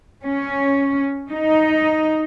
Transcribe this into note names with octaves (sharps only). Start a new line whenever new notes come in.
C#4
D#4